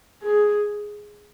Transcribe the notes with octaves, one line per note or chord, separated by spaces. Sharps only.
G#4